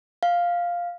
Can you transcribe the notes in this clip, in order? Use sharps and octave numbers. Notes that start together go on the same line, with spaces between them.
F5